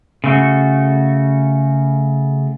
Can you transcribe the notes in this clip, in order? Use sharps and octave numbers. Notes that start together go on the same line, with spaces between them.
C#3 A3 F#4